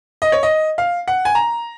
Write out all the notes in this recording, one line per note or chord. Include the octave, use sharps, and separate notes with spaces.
D#5
C#5
D#5
F5
F#5
G#5
A#5